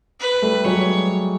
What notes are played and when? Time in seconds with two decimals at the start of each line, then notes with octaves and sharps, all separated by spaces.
0.20 B4
0.42 G3 A3
0.65 F#3 G#3 C#5